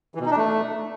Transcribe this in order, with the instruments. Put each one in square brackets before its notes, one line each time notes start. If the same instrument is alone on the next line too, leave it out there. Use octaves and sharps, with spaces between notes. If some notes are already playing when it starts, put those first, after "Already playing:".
[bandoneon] E3
B2
D#4
D4
A3